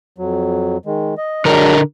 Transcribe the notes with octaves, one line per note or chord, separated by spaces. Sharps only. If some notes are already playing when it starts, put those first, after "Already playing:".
F2 F#3
D#3 G#3
D#5
D3 F#3 G#3 D4 A#4